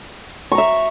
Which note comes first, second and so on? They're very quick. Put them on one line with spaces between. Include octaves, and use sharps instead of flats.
C#6 A#5 E5